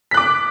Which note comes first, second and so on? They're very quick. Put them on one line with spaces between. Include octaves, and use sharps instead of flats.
B6 F#6 D6